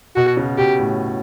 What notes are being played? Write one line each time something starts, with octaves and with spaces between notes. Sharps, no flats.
B2 F#4
C#3
B2 G4
A2